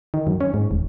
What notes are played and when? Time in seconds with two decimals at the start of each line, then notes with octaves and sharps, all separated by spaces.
0.14 D#3
0.27 F#2
0.41 C#4
0.54 G#2
0.71 D#1